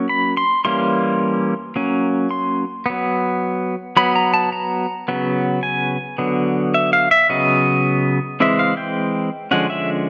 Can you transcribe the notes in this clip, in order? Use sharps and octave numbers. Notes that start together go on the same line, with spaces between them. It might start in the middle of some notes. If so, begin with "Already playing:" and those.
Already playing: F#3 A#3 C#4
B5
C6
E3 G3 A#3 C#4 C6
F#3 A#3 C#4
C6
F#3 B3
F#3 B3 B5
A#5
A5
A#5
C#3 F#3 B3
G#5
D3 F#3 B3
E5
F5
E5
C#3 F#3 B3 D#5
E3 G#3 C4 E5
F5
G5
D3 F3 G#3 C#4 F#5
E5